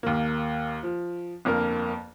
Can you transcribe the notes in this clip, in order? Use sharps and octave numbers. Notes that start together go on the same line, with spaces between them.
D#2 A#3
F3
G1 F2 A#3 A#4